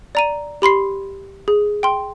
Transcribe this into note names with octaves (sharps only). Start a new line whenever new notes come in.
D5 A#5 D#7
G4 B5 C6 C7
G#4
G5 C6